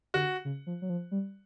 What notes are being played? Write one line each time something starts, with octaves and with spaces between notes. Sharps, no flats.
D3 F#4
C#3
F3
F#3
F3
G3